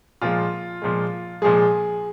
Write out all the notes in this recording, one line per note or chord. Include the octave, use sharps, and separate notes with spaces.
A#2 F3 G#3 F4
A#2 F3 G#3
A#2 F3 G#3 G#4